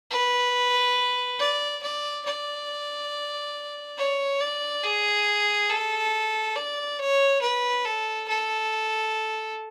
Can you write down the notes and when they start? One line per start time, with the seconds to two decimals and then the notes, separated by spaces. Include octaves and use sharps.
0.11 B4
1.39 D5
1.83 D5
2.26 D5
3.98 C#5
4.40 D5
4.83 G#4
5.70 A4
6.56 D5
6.99 C#5
7.42 B4
7.85 A4
8.28 A4